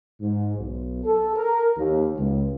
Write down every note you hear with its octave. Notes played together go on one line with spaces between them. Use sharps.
G#2
B1
A4
A#4
D#2
C#2